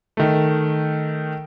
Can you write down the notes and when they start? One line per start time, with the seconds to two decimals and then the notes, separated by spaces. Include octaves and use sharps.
0.17 D#3 A3